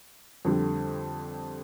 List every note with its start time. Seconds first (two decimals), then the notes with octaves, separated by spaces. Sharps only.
0.45 F2 D3 G3